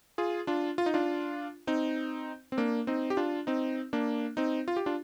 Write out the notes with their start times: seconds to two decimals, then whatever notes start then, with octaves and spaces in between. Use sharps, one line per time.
0.18 F4 G#4
0.47 D4 F4
0.78 F4
0.86 D#4
0.94 D4 F4
1.67 C4 D#4
2.52 C4
2.57 A#3 D4
2.87 C4 D#4
3.10 G4
3.17 D4 F4
3.47 C4 D#4
3.93 A#3 D4
4.37 C4 D#4
4.68 F4
4.77 G4
4.86 D4 F4